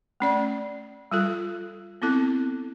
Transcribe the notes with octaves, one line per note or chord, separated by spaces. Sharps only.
A3 C#4 D5
G3 F4 A4
B3 C4 E4 A4